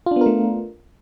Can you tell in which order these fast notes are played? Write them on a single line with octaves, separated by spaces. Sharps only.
F4 D4 B3 A#4 A3